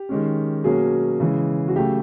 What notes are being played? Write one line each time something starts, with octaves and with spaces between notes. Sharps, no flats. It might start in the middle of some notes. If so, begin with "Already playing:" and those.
Already playing: G4
D#3 G#3 C#4
B2 F#3 A#3 C#4 G#4
C#3 E3 G#3
F#4
C#3 F#3 A3 G4